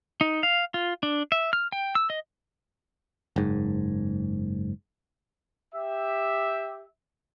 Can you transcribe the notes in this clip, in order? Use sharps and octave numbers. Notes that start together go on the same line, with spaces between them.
D#4
F5
F4
D4
E5
F6
G5
E6
D#5
F#1 G#2
G4 E5